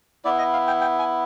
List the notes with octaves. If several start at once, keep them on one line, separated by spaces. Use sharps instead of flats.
B3 E4 D5
D#5
F5
G5
G5
G#5